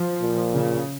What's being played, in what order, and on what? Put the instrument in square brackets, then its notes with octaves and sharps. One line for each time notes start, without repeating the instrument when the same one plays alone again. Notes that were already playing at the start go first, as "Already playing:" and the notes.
Already playing: [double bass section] F3
[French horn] A#2
[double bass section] C#3